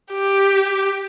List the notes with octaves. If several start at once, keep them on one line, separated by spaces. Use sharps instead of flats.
G4